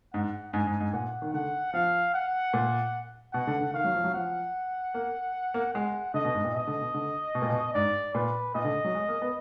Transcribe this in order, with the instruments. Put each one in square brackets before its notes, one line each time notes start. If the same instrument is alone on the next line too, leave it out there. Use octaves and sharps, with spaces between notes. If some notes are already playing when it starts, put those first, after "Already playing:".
[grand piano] G#2 [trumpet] F#5
[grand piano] G#2 [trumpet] G#5
[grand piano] G#2
G#2
[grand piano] A#2 [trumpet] F#5
[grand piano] D#3
[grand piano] D3 [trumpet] F#5
[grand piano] F3 [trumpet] F5
[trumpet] F#5
[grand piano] A#2
[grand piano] B2 [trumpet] F#5
[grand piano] D3
D3
[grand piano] D#3 [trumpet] F5
[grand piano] F#3
F3
F#3
[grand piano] F3 [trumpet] F#5
[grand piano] A#3
A#3
[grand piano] G#3 [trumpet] F#5
[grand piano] D3 [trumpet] D#5
[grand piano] B2
G#2
A#2
[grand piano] B2 [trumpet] D#5
[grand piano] D3
B2
D3
B2
A#2
B2
[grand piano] G#2 [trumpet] D5
[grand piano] A#2 [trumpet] B4
[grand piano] A#2 [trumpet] D#5
[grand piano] D3
F#3
G#3
A#3
B3